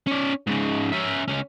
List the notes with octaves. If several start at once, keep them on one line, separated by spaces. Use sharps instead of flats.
C#4 D5
G#2 C#3
C#4 E5
C#2 C#4